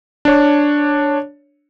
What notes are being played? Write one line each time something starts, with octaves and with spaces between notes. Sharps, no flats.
D4 C#5